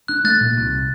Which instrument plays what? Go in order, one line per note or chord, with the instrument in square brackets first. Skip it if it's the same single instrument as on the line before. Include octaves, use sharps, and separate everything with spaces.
[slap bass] D4 [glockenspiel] F#6
[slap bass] A3 [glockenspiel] F#6 A6
[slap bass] A#2
C2